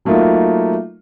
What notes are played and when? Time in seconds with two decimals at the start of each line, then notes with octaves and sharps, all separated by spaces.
0.05 F#3 A3 A#3 D#4 F4